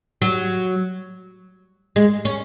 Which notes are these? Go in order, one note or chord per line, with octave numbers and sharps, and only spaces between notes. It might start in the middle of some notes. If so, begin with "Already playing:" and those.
F#3
G#3
C#4